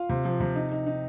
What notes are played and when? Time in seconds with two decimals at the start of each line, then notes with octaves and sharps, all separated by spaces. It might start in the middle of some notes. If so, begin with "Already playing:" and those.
Already playing: F4 F5
0.10 C3
0.25 F3
0.40 C3
0.56 D#4
0.72 D#4
0.87 D#4